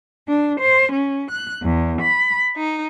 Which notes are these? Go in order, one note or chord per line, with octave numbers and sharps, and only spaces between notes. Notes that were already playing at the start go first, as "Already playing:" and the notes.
D4
C5
C#4
F#6
E2
B5
D#4